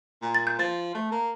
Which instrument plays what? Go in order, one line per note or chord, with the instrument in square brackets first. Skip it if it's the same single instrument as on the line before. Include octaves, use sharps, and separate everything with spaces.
[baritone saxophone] A#2
[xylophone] A6
G6
[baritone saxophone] F3 [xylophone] A6
[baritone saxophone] A3
A#3